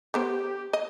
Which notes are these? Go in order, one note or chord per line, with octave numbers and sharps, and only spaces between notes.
D3 B3 G4 C5
D#5